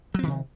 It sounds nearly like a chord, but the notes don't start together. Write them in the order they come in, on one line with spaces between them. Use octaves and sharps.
F#3 C4 D#3 C3